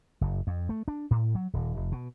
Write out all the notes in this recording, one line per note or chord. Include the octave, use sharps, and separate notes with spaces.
F#1
F2
A3
D4
A2
F#3
D#1
F1
B2